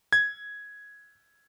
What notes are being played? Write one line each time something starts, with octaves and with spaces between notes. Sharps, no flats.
G#6